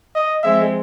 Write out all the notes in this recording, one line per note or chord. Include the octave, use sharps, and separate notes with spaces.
D#5
F3 G#3 C4 E5